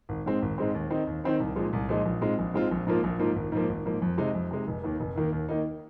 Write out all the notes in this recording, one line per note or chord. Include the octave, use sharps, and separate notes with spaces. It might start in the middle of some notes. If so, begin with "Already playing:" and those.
G#1
G#2 G#3 C4
G#1
G#2 G#3 C4
D#2
D#3 C4 D#4
D#2
D#3 C4 D#4
C2
A#2 F3 G#3 D#4
C2
A#2 F3 G#3 D#4
A#1
G#2 G#3 C4 F4
A#1
G#2 G#3 C4 F4
A#1
G#2 F3 A#3 F4
A#1
G#2 F3 A#3 F4
G#1
G#2 F3 A#3
G#1
G#2 F3 A#3
F2
C3 G#3 D#4
F2
C3 G#3 D#4
F1
D#2 D#3 A#3
F1
D#2 D#3 A#3
D#2
D#3 A#3 D#4